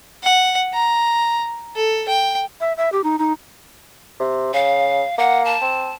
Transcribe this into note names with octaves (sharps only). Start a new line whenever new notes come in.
F#5
A#5
A4
G5
E5
E5
G4
D#4
D#4
C3
C#3 F5
A#3 F#5
A5
C4